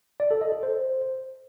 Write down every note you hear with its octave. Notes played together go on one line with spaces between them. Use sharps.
D5
A4
D#5
A4
C5